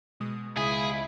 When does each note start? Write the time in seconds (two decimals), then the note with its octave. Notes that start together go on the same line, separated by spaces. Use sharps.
0.20 B2 G#3 D#6
0.57 C#2 E4 G#4